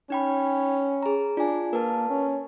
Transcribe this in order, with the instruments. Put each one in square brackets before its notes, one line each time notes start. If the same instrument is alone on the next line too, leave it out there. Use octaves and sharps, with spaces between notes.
[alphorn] C#4 [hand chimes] D#4 G5 B5
[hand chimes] G#4 A#5
[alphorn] D4 [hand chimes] F4 G#5
[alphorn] A#3 [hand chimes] A#4 B4 A5
[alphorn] C#4